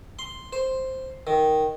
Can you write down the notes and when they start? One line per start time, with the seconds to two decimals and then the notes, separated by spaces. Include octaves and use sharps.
0.19 C6
0.53 C5
1.27 D#3